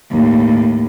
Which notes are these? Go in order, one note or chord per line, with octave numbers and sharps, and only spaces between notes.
D#2 A2